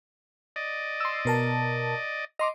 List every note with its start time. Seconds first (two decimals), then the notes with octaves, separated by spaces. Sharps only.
0.56 D5 D#5
1.00 C6 E6
1.25 B2 A#4 A5
2.39 D#5 A#5 C6 D6